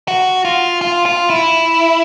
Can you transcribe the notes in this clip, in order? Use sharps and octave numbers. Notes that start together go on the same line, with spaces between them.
F#4
F4
F4
F4
E4